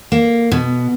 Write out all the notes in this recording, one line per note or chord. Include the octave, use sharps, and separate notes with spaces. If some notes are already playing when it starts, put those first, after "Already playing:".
A#3
B2